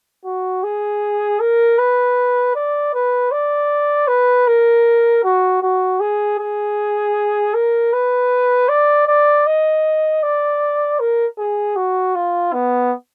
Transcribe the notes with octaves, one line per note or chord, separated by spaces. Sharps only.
F#4
G#4
A#4
B4
D5
B4
D5
B4
A#4
F#4
F#4
G#4
G#4
A#4
B4
D5
D5
D#5
D5
A#4
G#4
F#4
F4
B3